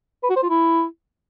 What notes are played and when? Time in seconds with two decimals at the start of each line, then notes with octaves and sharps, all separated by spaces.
0.23 B4
0.30 F#4
0.36 C5
0.43 F4
0.49 E4